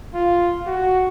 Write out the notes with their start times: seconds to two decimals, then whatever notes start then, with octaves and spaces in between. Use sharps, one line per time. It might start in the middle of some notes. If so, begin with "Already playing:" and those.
0.14 F4
0.67 F#4